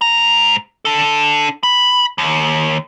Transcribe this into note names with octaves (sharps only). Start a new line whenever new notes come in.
G#2 A#5
D4 A4
B5
D#2